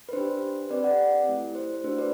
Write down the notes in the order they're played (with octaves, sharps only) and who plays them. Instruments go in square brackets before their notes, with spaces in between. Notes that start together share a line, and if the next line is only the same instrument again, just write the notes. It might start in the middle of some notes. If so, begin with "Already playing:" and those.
[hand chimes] B4
D4 G4 C5
C4 G4 B4 D5
D5 F#5
A3 E4 G4
C5
A3 D4 F#4 C5
B4 D5